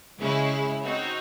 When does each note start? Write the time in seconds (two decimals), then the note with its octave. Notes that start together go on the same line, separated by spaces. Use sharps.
0.19 C#3 G#3 C#4 E4
0.82 C4 D#4 F#4 C#5